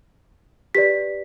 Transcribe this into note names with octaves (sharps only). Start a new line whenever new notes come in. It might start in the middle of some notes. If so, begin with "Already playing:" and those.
G4 B4 D5 B6